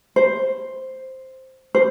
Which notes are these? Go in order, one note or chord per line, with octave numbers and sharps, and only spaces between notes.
C5
C5